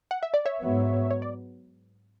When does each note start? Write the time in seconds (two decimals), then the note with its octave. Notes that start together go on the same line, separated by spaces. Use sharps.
0.11 F#5
0.23 E5
0.34 D5
0.46 C#5 E5
0.60 G#2 F#3 B3
1.11 C#5
1.22 D5